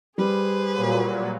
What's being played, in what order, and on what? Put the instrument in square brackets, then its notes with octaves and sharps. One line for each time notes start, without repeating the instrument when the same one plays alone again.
[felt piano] G3 [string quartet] G#4 B4 C5
[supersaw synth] A#2 F#3